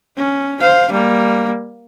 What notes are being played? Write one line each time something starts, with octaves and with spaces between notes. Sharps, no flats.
C#4
C5 F5
G3 A#3